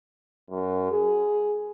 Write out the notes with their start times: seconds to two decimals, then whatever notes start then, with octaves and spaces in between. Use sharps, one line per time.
0.50 F#2
0.92 G#4